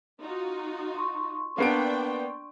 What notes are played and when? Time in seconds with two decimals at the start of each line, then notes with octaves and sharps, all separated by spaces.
0.21 D#4 F4 F#4
0.94 C6 C#6
1.58 A#3 B3 D4 G5 D7